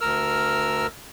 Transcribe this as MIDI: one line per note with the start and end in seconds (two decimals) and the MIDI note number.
0.01 0.87 38
0.01 0.87 70
0.01 0.87 88
0.01 0.87 89